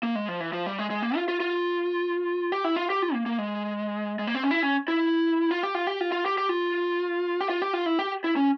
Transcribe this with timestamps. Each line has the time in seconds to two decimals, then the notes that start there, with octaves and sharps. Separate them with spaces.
0.03 A#3
0.15 G#3
0.28 F3
0.40 E3
0.53 F3
0.66 G3
0.79 G#3
0.90 G#3
1.02 A#3
1.16 F4
1.28 F4
1.40 F4
2.52 G4
2.64 E4
2.76 F4
2.90 G4
3.02 F4
3.14 A#3
3.26 A#3
3.38 G#3
4.19 G#3
4.27 A#3
4.35 C4
4.43 C#4
4.51 E4
4.63 C#4
4.88 E4
5.51 F4
5.63 G4
5.75 F4
5.87 G4
6.01 F4
6.12 F4
6.25 G4
6.38 G4
6.49 F4
7.40 G4
7.49 F4
7.62 G4
7.73 F4
7.86 E4
7.99 G4
8.24 E4
8.36 C#4